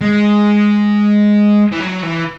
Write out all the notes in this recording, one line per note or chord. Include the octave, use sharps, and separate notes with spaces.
G#3
E3
F#3
E3